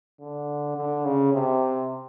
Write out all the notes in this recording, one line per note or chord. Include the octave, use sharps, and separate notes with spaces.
D3
D3
C#3
C3